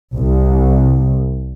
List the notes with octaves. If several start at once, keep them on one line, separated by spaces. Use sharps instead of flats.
C2